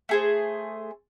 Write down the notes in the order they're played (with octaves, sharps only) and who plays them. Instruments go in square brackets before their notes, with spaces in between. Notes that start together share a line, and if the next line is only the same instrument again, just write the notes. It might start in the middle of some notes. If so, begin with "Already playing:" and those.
[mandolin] A3 G#4 C5